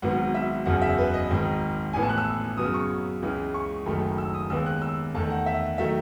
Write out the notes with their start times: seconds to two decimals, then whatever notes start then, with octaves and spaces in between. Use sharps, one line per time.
0.02 G#1 G#2 F#3 B3 F#5
0.34 E5
0.66 F#1 E2 C#3 F#3 F#5
0.82 E5
0.98 B4
1.14 D#5
1.30 G#1 G#2 D#3
1.93 A1 A2 E3 B3 G#5
2.03 A5
2.09 F#6
2.18 E6
2.58 F#2 C#3 F#3 B3 D#6
2.74 C#6
3.22 C#2 C#3 E3 G#3
3.54 C#6
3.86 F#1 F#2 D#3 A3 B5
4.18 E6
4.34 D#6
4.50 D#2 D#3 G#3 B3 E6
4.66 F#6
4.82 E6
5.15 E2 D#3 A3 A5
5.30 F#5
5.46 E5
5.78 D#3 F#3 A3 E5